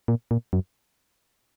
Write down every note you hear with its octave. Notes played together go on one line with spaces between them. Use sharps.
A#2
A#2
F#2